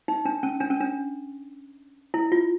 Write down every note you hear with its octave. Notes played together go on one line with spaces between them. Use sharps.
D#4
D4
C#4
D4
C#4
D4
E4
F4